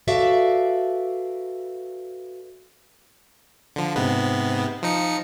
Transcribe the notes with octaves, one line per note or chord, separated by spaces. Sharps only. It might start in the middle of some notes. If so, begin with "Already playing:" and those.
F#4 A4 B4 D5 E5 F5
D3 F3
G#2 C3 B3
F3 D#4 C#7